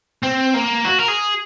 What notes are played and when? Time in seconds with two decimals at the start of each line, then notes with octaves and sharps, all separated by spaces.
0.23 C4
0.54 A#3
0.85 F#4
0.99 A#4
1.08 G#4